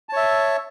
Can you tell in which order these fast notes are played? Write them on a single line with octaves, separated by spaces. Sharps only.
A5 C#5 E5